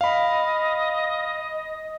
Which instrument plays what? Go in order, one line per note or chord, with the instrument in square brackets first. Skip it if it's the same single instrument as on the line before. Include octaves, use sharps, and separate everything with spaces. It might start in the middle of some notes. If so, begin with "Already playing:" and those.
[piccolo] D#5 [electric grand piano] F5 B5